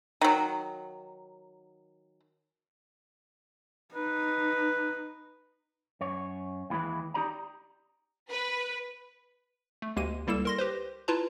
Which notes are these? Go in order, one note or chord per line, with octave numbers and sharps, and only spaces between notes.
D#3 F#3
D#4 B4
F#2 C#5
D#2 E3 G#3 E4 B4
D#4 G4 D5 A#5
B4
A3
D2 G#3 A#3 G4 D#7
C#2 G3 A#3 E4 A4 E7
A#4 C6 A#6
G4 B4 C5
E4 F4 B4 A5 A#5